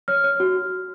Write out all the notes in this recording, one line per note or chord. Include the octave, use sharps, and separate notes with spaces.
C#5 F6
C#5
F#4